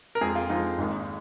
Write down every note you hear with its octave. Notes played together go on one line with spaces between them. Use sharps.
A#4
F2 F3 G#3 G#4
F4
F2 F3 G#3 D#4
G#1 G#2 D#3 A#3